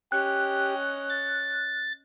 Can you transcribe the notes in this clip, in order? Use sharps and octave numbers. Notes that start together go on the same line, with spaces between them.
C#4 G4 D#5 F#6
A6